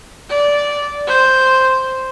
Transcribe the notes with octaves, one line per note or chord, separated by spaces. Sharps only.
D5
C5